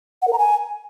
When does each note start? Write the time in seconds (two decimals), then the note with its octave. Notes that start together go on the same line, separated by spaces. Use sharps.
0.22 F#5
0.27 A#4
0.33 A#5
0.38 G#5